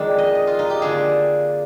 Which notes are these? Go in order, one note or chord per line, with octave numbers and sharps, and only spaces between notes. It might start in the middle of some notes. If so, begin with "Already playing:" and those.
Already playing: F2 D#3 G#3 D4
D#5
D#5
F4
D#4
G4
D3 F3 A#3 D4 G#4